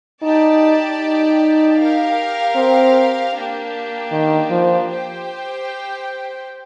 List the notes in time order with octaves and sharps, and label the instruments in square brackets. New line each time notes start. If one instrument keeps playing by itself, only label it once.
[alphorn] D#4 [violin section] G4 D5 A5
[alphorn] D#4
[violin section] G4 A#4 F5
[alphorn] C4
[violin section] A#3 D4 G4
[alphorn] D#3
F3
[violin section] G4 C5 G5